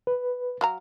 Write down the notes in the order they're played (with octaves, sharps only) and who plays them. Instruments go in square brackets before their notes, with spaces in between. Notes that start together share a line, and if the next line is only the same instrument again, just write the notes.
[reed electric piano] B4
[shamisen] F#3 F5 A#5